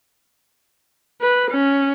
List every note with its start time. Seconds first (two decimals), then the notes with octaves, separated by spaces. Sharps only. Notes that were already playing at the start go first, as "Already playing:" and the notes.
1.21 B4
1.51 C#4